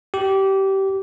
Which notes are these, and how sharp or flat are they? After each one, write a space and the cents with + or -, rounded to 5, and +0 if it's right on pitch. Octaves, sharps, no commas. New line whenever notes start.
G4 -20